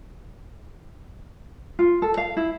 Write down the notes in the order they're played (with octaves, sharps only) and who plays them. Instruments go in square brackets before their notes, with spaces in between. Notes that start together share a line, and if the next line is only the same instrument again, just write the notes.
[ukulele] F4
A4
F5
E4